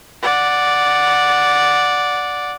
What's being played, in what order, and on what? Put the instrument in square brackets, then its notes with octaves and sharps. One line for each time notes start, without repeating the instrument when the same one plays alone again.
[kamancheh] D5 F#5